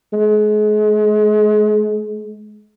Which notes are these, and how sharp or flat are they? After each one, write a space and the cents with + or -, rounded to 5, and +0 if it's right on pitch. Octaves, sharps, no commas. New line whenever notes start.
G#3 +35